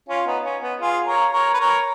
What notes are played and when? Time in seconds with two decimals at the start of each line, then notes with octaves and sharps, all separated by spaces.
0.09 C#4 F4
0.26 B3 D#4
0.45 C#4
0.62 B3
0.80 F4 G#4
1.06 A#4 C#5
1.33 A#4 C#5
1.54 B4
1.60 A#4 C#5